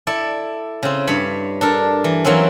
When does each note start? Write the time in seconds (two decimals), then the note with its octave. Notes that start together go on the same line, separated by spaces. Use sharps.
0.07 E4 A4 D5
0.83 C#3 C4
1.07 G2 C#5 B5
1.61 D4 A4 A#4
2.04 E3
2.25 E3 F#3 A#3 C4 C#4